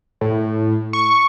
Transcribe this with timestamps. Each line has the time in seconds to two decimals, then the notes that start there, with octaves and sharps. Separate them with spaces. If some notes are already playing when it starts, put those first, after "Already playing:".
0.21 A2
0.93 C#6